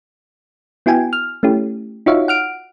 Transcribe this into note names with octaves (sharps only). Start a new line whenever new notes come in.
B3 E4 F#4 G5 G#5
F6
A3 C#4 E4 G4
D#4 F4 F#4 C#5 E5 F5
F#5 F6 D7